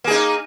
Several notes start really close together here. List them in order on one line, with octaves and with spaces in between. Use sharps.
A#3 G#4 D#4